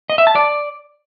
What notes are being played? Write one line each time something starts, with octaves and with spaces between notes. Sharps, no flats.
D#5
E5
A5
D5